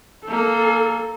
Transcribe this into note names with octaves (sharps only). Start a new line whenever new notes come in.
A#3 A4